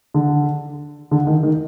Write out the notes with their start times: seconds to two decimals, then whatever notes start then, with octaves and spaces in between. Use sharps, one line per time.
0.14 D3
1.11 D3
1.27 D#3
1.43 D#3